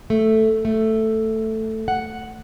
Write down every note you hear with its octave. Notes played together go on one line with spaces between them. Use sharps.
A3
A3
F#5